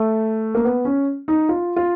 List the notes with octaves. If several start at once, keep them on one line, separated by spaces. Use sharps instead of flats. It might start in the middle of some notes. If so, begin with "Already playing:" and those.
Already playing: A3
A#3
B3
C#4
D#4
F4
F4